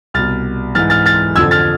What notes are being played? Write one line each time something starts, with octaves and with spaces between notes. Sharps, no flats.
C2 B2 F6 A6
G#2 E3 F6 A6
F6 A6
F6 A6
F2 D3 F3 E6 G#6
F6 A6